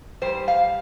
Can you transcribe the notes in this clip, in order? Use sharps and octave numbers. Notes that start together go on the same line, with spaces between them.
G#2 G3 C5
F5